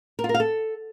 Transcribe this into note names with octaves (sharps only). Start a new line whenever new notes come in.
A#4
F4
A#4
F5
A4